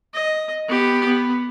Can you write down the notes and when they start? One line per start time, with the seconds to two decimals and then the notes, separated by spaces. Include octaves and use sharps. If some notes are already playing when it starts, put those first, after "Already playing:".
0.14 D#5
0.67 B3 G4
1.05 B3